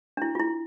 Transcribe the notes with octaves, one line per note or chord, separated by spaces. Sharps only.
D4
E4
F4
E4